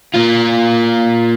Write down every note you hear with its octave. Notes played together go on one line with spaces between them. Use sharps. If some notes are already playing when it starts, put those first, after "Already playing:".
A#3 F4